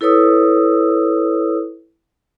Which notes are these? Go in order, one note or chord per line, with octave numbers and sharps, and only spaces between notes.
E4 A4 B4 C#5 D#6 E6